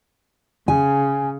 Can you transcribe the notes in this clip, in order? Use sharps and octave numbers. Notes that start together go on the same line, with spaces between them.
C#3 G#5